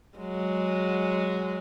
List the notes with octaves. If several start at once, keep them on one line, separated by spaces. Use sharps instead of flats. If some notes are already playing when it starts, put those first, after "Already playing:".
F#3 G#3